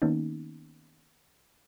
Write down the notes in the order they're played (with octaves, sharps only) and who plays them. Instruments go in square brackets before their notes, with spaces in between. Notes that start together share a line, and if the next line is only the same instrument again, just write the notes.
[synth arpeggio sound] D#3 A#3 B3 C#4 D#4